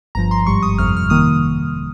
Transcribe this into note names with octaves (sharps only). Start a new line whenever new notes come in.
G1 G2 F3 A#5
C6
G#1 G#2 G3 C#6
D#6
G1 F2 C3 F6
F6
D#3 A#3 D#6